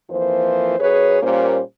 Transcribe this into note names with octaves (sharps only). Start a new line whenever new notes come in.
F2 E3 F3 A#3 C5
F#2 G#4 B4 C#5
A#2 G3 A#3 C#4 C5